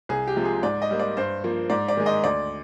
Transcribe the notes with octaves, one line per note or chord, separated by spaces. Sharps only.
C2 G#4
G4
C3 F3 G#3
G#4
G#2 D5
D#5
G3 A#3
D5
G2 C5
F3 A#3
G#2 D5
D5
D#3 G#3
D#5
D2 D5